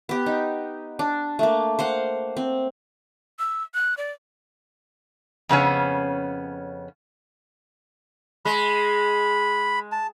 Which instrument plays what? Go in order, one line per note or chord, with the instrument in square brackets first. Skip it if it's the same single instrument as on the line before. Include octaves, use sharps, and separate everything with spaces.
[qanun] B3 G4
D#4
D4
A3 A#3
C5 F5 F#5
C4
[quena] E6
F#6
D5
[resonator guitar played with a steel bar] F2 C#3 B3 C#4
[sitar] G#3 [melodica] B5
[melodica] A5